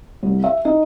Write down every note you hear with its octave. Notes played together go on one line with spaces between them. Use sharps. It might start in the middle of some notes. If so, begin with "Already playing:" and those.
C2
E5
D#4